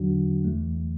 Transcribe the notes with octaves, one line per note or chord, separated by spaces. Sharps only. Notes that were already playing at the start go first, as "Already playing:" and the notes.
Already playing: E2 D3 F#3 D4 F#4
E2 E3 A3